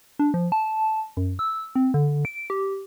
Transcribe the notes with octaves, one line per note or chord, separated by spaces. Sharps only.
D4
F3
A5
F#2
E6
C4
D3
D7
G4